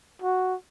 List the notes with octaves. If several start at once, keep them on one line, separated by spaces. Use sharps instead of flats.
F#4